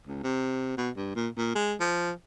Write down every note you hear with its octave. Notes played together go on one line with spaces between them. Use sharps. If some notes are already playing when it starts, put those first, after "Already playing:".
C#2
C3
B2
G2
A#2
A#2
G#3
F3